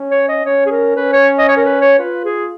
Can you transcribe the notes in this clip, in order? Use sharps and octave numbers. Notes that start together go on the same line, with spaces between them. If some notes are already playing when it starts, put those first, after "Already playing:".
Already playing: C#4
C#5
D#5
C#4 C#5
G#4
A#4
C#4 B4
C#5
D#5
C#5
A#4
B4
C#5
F4 B4
G#4